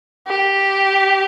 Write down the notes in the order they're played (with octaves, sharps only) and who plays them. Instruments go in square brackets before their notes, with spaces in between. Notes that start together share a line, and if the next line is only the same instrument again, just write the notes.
[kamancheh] G4